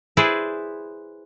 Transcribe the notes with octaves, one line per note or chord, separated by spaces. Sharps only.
E4 G#4 B4 C5 D5